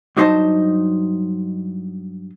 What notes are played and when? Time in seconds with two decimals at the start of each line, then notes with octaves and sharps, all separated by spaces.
0.17 G2 F#3 D#4 C5 D#5 A5